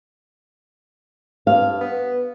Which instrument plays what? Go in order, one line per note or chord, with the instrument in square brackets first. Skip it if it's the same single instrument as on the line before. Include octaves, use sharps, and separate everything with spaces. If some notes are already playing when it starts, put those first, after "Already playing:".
[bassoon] G2 [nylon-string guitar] F5
[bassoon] B3